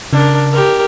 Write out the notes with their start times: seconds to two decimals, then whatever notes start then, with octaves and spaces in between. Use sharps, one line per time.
0.13 C#3 D4 A#4
0.52 G4 A#4